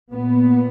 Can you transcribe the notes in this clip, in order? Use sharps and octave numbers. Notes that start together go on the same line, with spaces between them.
A#2 B3